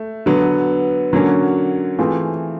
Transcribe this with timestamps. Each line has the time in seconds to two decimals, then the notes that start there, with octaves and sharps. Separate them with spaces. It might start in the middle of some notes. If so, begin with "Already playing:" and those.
Already playing: A3
0.26 D3 F#3 B3
1.13 D3 F#3 A#3 C#4
1.99 E3 A3 C4 F4 G#4